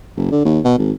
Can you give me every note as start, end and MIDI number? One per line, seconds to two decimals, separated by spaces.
0.17 0.28 30
0.32 0.42 50
0.45 0.60 39
0.65 0.75 47
0.78 0.91 32